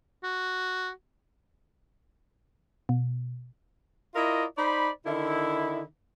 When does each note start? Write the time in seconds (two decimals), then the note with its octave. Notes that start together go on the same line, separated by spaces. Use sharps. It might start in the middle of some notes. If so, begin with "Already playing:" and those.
0.24 F#4
2.89 B2
4.15 E4 F4 A#4 D5 D#5
4.57 D#4 C5 D5 B5
5.06 D3 D#3 E4